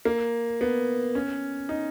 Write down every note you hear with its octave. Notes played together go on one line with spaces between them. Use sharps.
A#3
B3
C#4
D#4